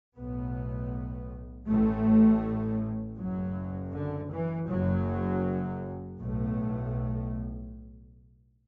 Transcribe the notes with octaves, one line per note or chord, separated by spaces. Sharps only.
B1 A2 B3
A1 A2 A3
F#1 F#2 F#3
D3
E3
F#1 F#2 F#3
B1 A2 A3